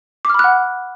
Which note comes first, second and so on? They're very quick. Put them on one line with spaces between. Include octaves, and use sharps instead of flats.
D6 F6 B5 F#6 F#5